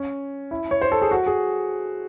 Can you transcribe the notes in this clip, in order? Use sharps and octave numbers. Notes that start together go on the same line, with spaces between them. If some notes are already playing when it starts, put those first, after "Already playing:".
Already playing: C#4
E4
C#5
C5
A4
G#4
F#4
G#4